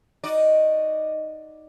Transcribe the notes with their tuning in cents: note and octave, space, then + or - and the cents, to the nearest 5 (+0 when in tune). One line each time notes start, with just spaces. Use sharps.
D#4 +0 F#4 +0 D5 +0